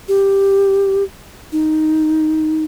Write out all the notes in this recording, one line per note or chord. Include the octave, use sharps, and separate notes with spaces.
G4
D#4